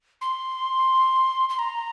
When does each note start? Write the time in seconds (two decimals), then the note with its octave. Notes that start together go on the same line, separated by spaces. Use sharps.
0.21 C6
1.49 C6
1.59 A#5